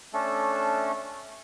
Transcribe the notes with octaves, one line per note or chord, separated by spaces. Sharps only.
A3 C#4 D4 A4